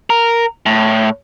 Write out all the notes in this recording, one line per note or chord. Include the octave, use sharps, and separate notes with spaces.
A#4
A2